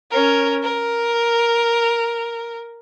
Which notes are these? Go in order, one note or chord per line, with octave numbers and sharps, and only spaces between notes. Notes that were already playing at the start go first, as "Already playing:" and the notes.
C#4 A#4
A#4